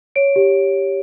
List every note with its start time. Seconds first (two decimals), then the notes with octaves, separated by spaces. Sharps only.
0.16 C#5 D7
0.36 G4